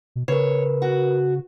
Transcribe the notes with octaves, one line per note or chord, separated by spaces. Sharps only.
B2
C#3 A#4 B4 C#5
F#4